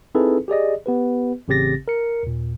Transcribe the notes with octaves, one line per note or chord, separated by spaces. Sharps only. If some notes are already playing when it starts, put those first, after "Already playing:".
C4 D#4 E4 G#4 A4 B4
G4 G#4 D5 D#5
B3 G4 B4
A1 C#3 C4 G4 A6 A#6
A#4 C#7
D#2 A#2